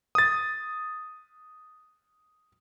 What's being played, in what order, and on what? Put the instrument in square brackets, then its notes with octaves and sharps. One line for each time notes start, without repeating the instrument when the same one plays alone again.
[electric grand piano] D#6 A6